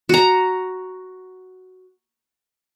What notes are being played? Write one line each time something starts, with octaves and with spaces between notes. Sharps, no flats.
F#4 A#5